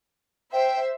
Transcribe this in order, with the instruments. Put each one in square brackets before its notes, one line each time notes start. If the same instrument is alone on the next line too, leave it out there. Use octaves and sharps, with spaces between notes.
[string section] C5 E5 [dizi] G5